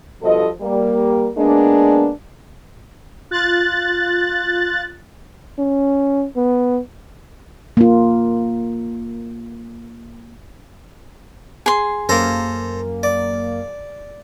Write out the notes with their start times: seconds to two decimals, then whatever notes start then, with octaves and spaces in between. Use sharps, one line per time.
0.22 G2 B2 F3 A4 D#5
0.61 G3 A#3
1.37 G#3 A#3 B3 D4
3.31 F4 F#6 A6
5.59 C#4
6.36 B3
7.77 A#3 F4
11.66 G#4 C6
12.09 F#2 A#3 A4 C5 A#5
13.03 D5